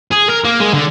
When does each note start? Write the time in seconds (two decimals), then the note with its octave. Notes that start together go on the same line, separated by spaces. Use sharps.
0.12 G#4
0.30 A#4
0.45 A#3
0.60 G#3
0.74 D3